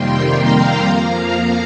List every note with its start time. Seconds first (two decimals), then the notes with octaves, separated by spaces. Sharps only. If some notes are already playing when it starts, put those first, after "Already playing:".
Already playing: F2 C3 D#3 G3 A#3 G5 C6
0.38 F5 A#5
0.87 F2 F3 A#3